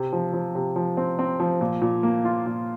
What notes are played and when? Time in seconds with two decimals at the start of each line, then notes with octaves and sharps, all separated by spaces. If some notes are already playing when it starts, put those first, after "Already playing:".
Already playing: C3
0.12 F3
0.33 F3
0.55 C3
0.76 F3
0.97 C4
1.19 C4
1.40 F3
1.61 A#2
1.82 A#2
2.03 A#3
2.25 F4
2.46 A#2